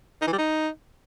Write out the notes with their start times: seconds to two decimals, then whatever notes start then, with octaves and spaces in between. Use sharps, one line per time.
0.22 D#4
0.27 E3
0.33 G3
0.38 D#4